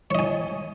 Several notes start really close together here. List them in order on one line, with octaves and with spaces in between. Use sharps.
C#5 D#5 G#5